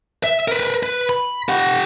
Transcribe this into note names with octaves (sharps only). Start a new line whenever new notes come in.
E5
A#4 B4
B4
B5
G4 F#5